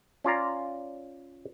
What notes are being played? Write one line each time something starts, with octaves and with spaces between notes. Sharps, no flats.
C#4 F4 D5 A#5